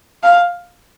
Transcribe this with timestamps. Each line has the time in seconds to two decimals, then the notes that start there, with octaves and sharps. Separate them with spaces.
0.23 F5